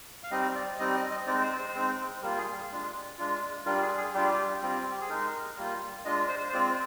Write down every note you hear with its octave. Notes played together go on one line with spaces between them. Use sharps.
F5
G3 C4 D#4 D#5
D5
G3 C4 D#4 D#5
D#5
D#5
G#3 C4 D#4 D5
C5
C5
G#3 C4 D#4
G3 A#3 F4 A#4
G#4
G#3 D4 F4
G#3 D4 F4
G3 D4 F4 A#4
G#4
G#4
G3 D4 F4 G4
G3 C4 F4
G4
G#4
G#3 D#4 A#4
G3 A#3 F4
G#3 D4 F4 D#5
C5
C5
G#3 C4 F4 D5